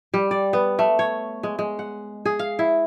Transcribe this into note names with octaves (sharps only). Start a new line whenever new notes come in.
G3
D5
B3
A3
C#5
G#3
G#3
F#5
G#4
F5
E4